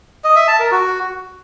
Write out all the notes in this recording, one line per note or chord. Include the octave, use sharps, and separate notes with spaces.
D#5
E5
A5
A#4
F#4